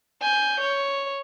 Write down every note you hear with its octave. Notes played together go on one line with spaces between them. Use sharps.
G#5 G6
C#5